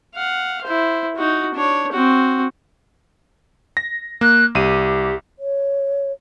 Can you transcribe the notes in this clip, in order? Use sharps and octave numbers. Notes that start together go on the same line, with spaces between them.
F5 F#5
E4 C5
D#4 F#4
D4 C#5
C4 F#4
A#6
A#3 F#6
C2 G4 D#7
C#5